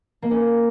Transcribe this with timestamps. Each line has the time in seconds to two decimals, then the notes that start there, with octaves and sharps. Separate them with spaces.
0.22 A#3
0.31 C#4